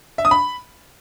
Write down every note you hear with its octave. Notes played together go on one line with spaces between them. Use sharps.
E5
D#6
B5